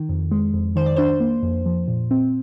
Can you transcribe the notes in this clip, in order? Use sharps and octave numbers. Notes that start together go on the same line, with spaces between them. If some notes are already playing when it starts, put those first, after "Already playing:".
Already playing: D#3
F2
G#3
F2
D#3 C5
D5
D4 C5
A#3
F2
F3
A#2
C4